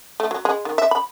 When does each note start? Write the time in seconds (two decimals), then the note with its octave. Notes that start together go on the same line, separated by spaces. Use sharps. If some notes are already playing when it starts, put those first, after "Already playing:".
0.20 A3
0.31 F#3
0.45 G#3
0.65 D#3
0.78 E5
0.91 B5